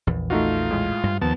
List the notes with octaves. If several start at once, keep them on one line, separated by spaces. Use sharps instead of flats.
A#1 E2
A3 D#4 F4 F#4
A2 G#3
G2
D#2 F3 B3 A5